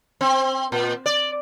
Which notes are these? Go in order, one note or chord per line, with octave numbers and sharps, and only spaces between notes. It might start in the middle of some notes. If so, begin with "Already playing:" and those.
C4
A#2
D5